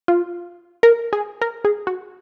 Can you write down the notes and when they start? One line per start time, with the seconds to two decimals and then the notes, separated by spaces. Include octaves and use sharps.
0.08 F4
0.83 A#4
1.13 G#4
1.41 A#4
1.65 G#4
1.87 F#4